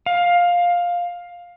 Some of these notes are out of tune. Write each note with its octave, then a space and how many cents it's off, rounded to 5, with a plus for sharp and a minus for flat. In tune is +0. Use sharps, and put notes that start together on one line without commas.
F5 +10